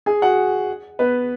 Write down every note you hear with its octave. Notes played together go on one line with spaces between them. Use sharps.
G#4 G#5
F#4 F#5
B3 B4